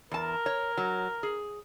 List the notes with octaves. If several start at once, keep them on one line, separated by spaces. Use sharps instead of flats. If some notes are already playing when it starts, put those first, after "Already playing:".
E2 A#4 A5
C#5
F#3
G#4